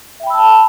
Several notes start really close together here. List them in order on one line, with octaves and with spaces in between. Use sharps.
E5 G5 B5 E6 A5